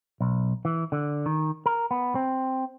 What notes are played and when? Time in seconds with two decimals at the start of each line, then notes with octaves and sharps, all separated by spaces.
0.21 B1
0.65 E3
0.92 D3
1.26 D#3
1.66 A#4
1.91 B3
2.15 C4